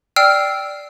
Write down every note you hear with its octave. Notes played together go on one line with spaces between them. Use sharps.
D5 G5 E6 F6 C7